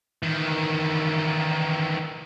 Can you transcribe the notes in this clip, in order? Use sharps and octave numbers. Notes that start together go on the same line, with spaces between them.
D#3 E3